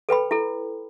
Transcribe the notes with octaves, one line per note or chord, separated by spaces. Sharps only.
A4 B4 G5 B5
E4 A4